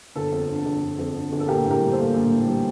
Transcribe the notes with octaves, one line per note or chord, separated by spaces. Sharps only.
G1 A4
F2
D3
G1
G1
F2
D3
G1
A4
A#1 G4 A#4
A2
G4 A#4
G3
A4 C5
A#3
A#1
A2
G3